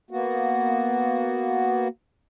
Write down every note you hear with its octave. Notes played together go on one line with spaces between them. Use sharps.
A#3 B3 F#4